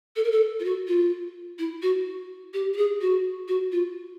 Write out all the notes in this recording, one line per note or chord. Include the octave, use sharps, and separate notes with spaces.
A4
A#4
A4
F4
F#4
F4
E4
F#4
G4
G4
G#4
F#4
F#4
F4